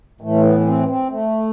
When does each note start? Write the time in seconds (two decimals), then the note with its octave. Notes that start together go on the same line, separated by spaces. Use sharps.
0.21 A2 E3 A3
0.43 B3
0.60 B3
0.66 C4
0.88 C4
1.10 A3